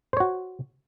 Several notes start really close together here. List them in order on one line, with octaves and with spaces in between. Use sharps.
C5 C#5 F#4